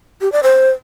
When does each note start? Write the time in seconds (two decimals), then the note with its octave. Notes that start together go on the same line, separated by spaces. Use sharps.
0.21 G4
0.32 D5
0.43 C5